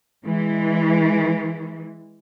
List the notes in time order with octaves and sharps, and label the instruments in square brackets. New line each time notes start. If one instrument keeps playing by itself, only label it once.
[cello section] E3 G#3